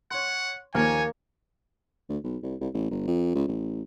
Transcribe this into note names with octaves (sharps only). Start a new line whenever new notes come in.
C#5 F#5 C6
D#2 F3 A#3 C#5 G#5 F6
D2
B1
C2
C2
A1
G1
F2
C#2
A1